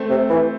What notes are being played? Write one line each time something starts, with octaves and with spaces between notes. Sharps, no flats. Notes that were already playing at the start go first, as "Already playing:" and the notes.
Already playing: A3 C4
C3
E3